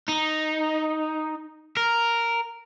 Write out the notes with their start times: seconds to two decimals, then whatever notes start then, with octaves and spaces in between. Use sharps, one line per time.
0.08 D#4
1.77 A#4